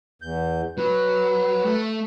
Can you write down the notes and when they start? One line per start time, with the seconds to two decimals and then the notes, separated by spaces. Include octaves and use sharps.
0.22 E2 G6
0.78 F#3 B4
1.65 A3